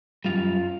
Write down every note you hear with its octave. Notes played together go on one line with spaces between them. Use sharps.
F#2 D#3 G3 F4 F5